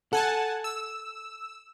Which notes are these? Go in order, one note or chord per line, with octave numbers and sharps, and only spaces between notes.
A4 F#5 G#5 A5
E6